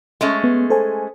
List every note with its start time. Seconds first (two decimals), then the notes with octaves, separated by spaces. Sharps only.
0.21 G#3 A3 C#4
0.44 B3
0.70 A4 C5 G#5